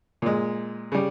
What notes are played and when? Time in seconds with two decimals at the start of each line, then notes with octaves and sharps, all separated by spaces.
0.22 A#2 G#3
0.92 C#3 G3